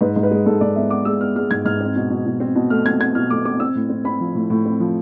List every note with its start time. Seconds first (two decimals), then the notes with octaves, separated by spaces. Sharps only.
0.01 G#2 B4
0.16 G#2
0.23 B4
0.31 G#3
0.46 G#2 A4
0.61 G#2 D5
0.76 B3 E5
0.90 B3 D6
1.05 G#3 E6
1.20 B3 F6
1.36 G#3 F6
1.51 G#2 G#6
1.65 G#2 F6
1.80 C4
1.96 B2
2.10 B2
2.26 B2
2.40 C4
2.55 B2
2.70 A3 F6
2.86 C4 G#6
3.00 C4 G#6
3.15 B2 F6
3.30 A3 D6
3.45 C4 D6
3.60 C4 E6
3.75 A2
3.89 C4
4.05 C4 B5
4.20 F3
4.35 A2
4.50 A2
4.65 C4
4.80 F3